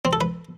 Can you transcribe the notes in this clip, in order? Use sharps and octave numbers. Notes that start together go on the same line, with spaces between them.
C4
A4
B4